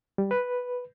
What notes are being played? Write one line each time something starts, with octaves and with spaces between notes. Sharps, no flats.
G3
B4